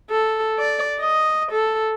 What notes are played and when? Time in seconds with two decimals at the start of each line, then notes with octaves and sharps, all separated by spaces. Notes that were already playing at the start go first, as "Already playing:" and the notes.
0.11 A4
0.59 D5
1.01 D#5
1.52 A4